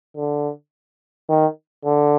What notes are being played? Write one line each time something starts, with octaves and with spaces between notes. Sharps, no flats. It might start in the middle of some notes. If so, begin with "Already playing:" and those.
D3
D#3
D3